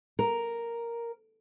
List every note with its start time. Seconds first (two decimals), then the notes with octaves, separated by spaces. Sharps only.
0.19 A#4